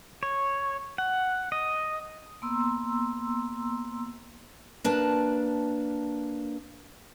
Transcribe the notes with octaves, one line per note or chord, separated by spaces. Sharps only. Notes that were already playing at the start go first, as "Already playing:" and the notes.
C#5
F#5
D#5
A#3 B3 A#5 C6 E6
A#3 D4 B4 A5